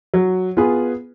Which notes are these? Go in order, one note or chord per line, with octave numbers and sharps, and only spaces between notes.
F#3
B3 F4 G#4 B4